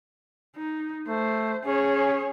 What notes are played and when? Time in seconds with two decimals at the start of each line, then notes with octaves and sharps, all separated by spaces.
0.56 D#4
1.08 A3 C5
1.65 C#4 G#4 C#5